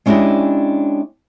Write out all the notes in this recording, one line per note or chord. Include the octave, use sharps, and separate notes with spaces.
G#3 C#4 D4 E4 G4 D#5